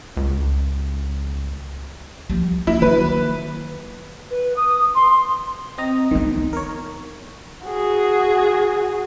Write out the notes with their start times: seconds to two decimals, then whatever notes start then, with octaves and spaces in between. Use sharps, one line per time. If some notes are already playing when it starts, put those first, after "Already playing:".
0.17 C#2
2.30 F3 G3
2.67 A#3 E4
2.82 D#3 F#3 A#3 B4
4.30 B4
4.56 D#6
4.94 C6
5.78 C4 D#5 A#5
6.11 D#3 B3 D#4
6.53 A#4 C#5
7.66 F#4 G#4